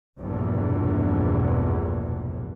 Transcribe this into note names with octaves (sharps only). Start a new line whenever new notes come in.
F1 A#1 E2 G2 B2 E3